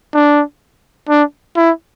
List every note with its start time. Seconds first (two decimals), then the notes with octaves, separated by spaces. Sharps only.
0.14 D4
1.09 D4
1.56 E4